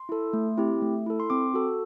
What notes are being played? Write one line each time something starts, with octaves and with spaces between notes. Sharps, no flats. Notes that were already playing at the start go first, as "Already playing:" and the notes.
Already playing: C6
E4 A4
A3
C4 E4 G4
A3
E4 A4
C6
C4 D6
F#4 A4